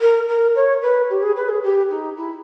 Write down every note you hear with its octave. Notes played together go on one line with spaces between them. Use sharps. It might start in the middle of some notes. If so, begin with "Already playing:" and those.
A#4
A#4
C#5
B4
G4
G#4
B4
G#4
G4
D#4
E4